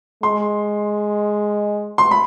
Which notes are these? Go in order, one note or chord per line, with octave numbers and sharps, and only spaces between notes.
G#3 C6
C6
B5